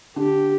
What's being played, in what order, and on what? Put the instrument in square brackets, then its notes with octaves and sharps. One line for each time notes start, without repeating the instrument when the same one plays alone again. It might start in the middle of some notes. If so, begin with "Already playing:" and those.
[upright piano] D3 [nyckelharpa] G4